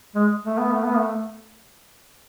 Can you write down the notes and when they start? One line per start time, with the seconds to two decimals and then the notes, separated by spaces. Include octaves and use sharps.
0.15 G#3
0.45 A3
0.58 B3
0.72 A3
0.84 B3
0.97 A3